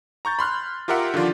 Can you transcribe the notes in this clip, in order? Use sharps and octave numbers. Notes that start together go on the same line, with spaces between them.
A#5 C#6 G6 A6
B5 C6 F6 F#6
F4 G4 A#4 E5 F#5 C6
D3 D#3 F3 F4 D5